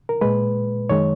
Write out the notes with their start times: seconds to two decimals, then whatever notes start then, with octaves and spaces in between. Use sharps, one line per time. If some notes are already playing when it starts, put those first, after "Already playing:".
0.09 A#4
0.21 A#2 G#3 B4
0.89 F#2 D#3 G#3 C#5